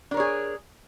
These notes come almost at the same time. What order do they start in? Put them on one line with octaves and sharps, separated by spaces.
D4 A#4 C#5 G#4